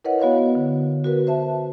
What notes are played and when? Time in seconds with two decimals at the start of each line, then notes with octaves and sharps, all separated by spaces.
0.05 E4 A#4 B4 C#5 D#5 F#5
0.20 B3 F#4 C#5 F5 F#5
0.55 D3
1.04 F#4 A#4 B4
1.27 C5 E5 A5